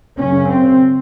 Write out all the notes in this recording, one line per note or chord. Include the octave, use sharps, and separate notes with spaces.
F#2 C#3 C#4
C4